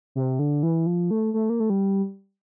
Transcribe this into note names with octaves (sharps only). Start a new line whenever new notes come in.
C3
D3
E3
F3
A3
A3
A#3
A3
G3